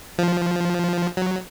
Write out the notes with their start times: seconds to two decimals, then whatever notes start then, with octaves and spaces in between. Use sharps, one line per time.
0.18 F3
1.17 F#3